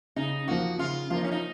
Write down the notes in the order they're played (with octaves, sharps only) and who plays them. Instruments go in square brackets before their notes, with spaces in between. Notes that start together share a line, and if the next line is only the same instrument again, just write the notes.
[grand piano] C#3 [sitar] D#4
[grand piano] F3 A#3 [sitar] F#4
[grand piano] C#3 [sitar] F4
[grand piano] F3 A#3 [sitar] F4
[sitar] D#4
C#4
D#4